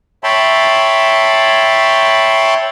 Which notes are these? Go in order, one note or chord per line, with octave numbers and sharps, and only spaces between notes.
C#5 E5 G5 A5 B5 C6